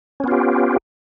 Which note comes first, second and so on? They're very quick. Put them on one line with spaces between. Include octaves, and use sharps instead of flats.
C#4 B3 F4 G4